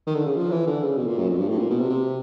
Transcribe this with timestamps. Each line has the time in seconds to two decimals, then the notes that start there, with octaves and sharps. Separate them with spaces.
0.07 D#3
0.15 D3
0.26 C#3
0.36 F3
0.51 E3
0.67 D3
0.82 C#3
0.97 B2
1.07 A#2
1.18 F#2
1.29 F2
1.39 G2
1.49 A2
1.58 A#2
1.70 B2
1.80 C3
1.90 C3